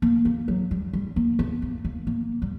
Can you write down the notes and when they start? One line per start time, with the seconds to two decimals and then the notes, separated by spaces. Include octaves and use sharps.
0.02 A#3
0.25 A#3
0.48 F#3
0.71 G3
0.93 G3
1.16 A#3
1.39 B3
1.62 A#3
1.85 A#3
2.07 A#3
2.42 G3